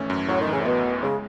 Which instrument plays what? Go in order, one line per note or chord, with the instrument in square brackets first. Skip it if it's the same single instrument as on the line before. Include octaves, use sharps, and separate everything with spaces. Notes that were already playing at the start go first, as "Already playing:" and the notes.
Already playing: [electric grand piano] G#1 E3 A3 C#4
F#2
[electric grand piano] A2 [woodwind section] F#3
[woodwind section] D#3
[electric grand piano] E3
[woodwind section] C#3
A2
[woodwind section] B2 [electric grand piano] B3
[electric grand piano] A1
[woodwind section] C#3 [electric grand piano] G#3